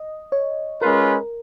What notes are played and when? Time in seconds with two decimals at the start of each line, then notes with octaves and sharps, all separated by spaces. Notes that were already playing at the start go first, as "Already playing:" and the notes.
Already playing: D#5
0.32 C#5
0.81 G#3 C#4 F4 A#4 B4
1.06 A#4